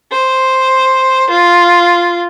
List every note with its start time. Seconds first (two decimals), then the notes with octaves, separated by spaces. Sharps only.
0.11 C5
1.30 F4